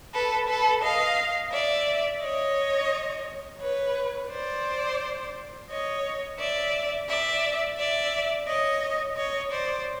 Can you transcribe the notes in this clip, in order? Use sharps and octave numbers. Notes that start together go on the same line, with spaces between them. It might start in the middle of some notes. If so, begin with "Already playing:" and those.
A4 B4
A4 B4
D#5 F5
D5 E5
C#5 D#5
B4 C#5
C5 D5
C#5 D#5
D5 E5
D5 E5
D5 E5
C#5 D#5
C#5 D#5
C5 D5